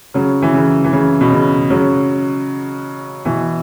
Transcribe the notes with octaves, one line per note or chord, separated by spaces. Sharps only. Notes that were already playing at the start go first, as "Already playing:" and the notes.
C#3 F#3
E3
C#3
E3
C#3
B2
C#3
C#3 F#3
B2 E3